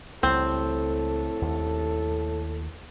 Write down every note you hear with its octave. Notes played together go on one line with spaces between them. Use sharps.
C#2 A2 G3 C4 A4
D#2